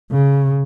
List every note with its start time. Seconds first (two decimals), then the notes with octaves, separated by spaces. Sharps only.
0.11 C#3